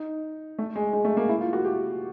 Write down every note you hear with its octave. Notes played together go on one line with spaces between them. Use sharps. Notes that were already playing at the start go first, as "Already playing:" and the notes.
Already playing: D#4
A3
G#3
G#3
A3
A#3
E4
F4
F#4
G4